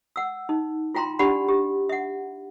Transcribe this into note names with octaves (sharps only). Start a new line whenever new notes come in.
F#5 E6
D#4
E4 F4 G5 A#5 C6
D4 G4 D5 F#5 B5
G4
E5 F#5